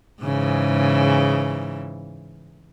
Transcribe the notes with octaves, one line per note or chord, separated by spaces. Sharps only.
G#2 C#3 E3